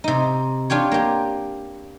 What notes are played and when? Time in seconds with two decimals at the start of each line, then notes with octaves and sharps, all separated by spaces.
0.04 C3 D#4
0.70 D4 F4 G4 C#5
0.92 A#3 G4